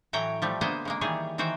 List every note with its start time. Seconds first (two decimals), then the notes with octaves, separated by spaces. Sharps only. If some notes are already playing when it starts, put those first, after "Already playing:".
0.13 A2 E3 F#3 C#5 G5 A#5
0.42 F3 G3 A3
0.61 D3 G#3 A#3 B3 C5 D#5
0.85 C#3 G#3 A#3
1.01 D#3 E3 G3 G#4 C#5
1.38 D#3 E3 F#4 C5 G5